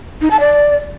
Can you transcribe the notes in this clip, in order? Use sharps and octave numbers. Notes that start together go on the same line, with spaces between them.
D#4
A5
D5